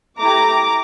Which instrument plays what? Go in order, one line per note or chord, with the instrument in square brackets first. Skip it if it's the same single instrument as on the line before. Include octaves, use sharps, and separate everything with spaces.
[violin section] A3 E4 G4 A#5 D6